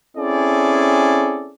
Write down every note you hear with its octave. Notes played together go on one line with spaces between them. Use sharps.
C4 C#4 E4 G#4 A4 D5